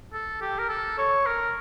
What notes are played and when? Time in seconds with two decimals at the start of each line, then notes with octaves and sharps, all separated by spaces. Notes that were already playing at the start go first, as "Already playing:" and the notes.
0.14 A4
0.41 G4
0.59 A#4
0.69 A4
0.98 C#5
1.26 A#4